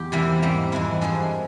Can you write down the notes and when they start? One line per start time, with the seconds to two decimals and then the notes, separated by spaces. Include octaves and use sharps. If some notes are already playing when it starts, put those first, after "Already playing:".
Already playing: E2 G4
0.12 C3 E3 G3 A#3 E4
0.42 G#2 G3 A#3
0.72 F2 E3 G#3 E4
1.01 G2 F3 G#3 G#4